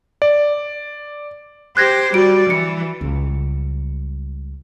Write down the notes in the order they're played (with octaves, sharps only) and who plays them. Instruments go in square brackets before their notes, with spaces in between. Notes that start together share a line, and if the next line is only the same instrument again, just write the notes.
[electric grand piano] D5
[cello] G4 C5 [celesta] F#6 G#6 A#6
[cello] G3 D5 [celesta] F#4 D7
[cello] E3 [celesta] C#7
[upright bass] C#2 G3